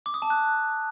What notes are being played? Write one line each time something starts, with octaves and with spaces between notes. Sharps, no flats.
D6
D#6
A5
F#6